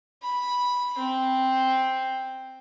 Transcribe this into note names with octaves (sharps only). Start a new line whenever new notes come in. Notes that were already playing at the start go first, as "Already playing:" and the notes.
B5
C4